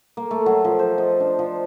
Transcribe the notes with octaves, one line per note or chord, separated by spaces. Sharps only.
A#3
A3
F#3
F3
C5
D#5
D4
F3